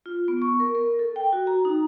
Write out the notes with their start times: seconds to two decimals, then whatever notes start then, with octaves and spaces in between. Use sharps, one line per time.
0.06 F4
0.28 B3
0.42 C#6
0.60 A#4
0.75 A#4
0.99 A4
1.16 G5
1.33 F#4
1.47 A#5
1.65 D#4